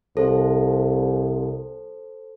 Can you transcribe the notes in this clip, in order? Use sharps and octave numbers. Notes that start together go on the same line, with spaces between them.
C2 A4 C5